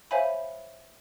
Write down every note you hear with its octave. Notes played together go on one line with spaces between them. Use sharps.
C5 C#5 E5 F5 G#5 B5